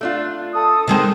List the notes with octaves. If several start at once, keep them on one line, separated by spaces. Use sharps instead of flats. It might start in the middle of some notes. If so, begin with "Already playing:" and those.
A3 D4 F4
A4 D#6
D#3 G#3 C4